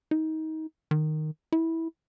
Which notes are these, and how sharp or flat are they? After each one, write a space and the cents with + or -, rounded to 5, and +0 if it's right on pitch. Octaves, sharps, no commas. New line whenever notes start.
D#4 +25
D#3 -10
E4 -15